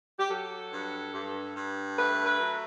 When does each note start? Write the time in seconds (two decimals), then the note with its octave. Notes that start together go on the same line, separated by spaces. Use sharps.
0.19 G4
0.30 F#3 A4
0.72 G2
1.14 G2
1.55 G2
1.97 A3 B4
2.25 B4
2.39 F#3